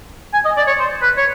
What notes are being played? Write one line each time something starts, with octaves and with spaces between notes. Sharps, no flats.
G#5
D#5
D5
C#5
C5
B4
C#5